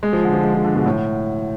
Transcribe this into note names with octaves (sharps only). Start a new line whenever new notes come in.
G#3
F3
D3
F3
G#3
F3
D3
B2
A2